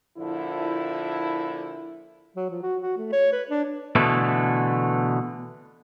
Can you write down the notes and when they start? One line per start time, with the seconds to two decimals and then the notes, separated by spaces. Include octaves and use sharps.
0.18 A#2 D3 F3 E4
2.36 F#3
2.50 F3
2.62 F#4
2.82 F#4
2.97 A3
3.13 C#5
3.32 B4
3.49 D4
3.95 B2 D3 E3 A3